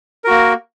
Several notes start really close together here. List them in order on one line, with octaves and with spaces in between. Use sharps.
A#4 F#4 A#3